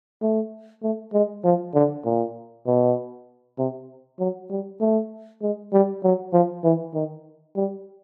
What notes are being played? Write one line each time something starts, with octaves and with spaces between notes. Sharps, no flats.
A3
A3
G#3
F3
D3
A#2
B2
C3
F#3
G3
A3
G#3
G3
F#3
F3
E3
D#3
G3